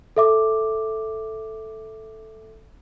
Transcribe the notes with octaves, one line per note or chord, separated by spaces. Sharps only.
A4 E5 D6